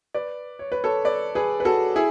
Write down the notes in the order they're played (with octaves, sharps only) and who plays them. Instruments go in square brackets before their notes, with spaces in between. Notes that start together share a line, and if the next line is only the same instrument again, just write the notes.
[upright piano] B4 D5
C#5
B4
A4 C#5
B4 D5
G#4 B4
B4
F#4 A4
E4 G#4